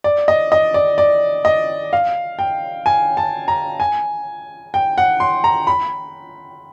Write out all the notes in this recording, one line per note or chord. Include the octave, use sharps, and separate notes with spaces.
D5
D#5
D#5
D5
D5
D#5
F5
G5
G#5
A5
A#5
G#5
G5
F#5
C6
A#5
B5